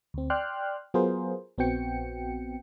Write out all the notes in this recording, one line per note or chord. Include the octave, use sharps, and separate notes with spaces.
D2 C4
D5 G5 C6 F6 F#6
F#3 B3 F4 G#4 A#4 C5
A#1 B3 C4 F#4 G5 C#7